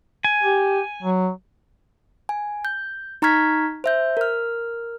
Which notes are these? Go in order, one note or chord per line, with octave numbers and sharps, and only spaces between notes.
G#5
G4
F#3
G#5
G6
D#4 A#5 C#6 F6 G#6 B6
C5 E5 G6
A#4 F6